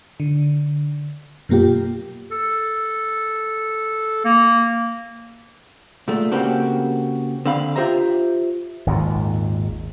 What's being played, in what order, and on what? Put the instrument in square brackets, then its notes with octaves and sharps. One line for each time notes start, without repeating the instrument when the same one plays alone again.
[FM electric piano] D3
F#2 B2 A#3 F4 G4
[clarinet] A4
A#3
[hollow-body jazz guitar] A#2 G#3 A3
C#3 A#3 C4 F#4 G4 A4
D3 C4 F5 B5
F4 G4 C5 E5 A#5
[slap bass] G#1 D#2 A#2